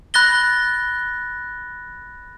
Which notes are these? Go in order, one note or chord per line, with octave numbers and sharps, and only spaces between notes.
B5 F#6 A6 A#6 G7